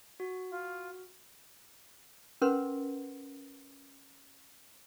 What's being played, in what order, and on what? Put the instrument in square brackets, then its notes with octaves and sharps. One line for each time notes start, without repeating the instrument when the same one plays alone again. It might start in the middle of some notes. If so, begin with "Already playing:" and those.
[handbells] F#4
[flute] F4
[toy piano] C#4 A#4 B4 F#5 C6